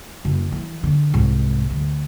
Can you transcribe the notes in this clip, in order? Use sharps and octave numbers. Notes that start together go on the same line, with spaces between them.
F#1
E3
D3
C2 G#2
D2